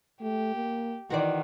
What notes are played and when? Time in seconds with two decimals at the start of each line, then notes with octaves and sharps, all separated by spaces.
0.22 A3 G4
0.55 A#3
1.10 D#3 E3 F#4 C5 D5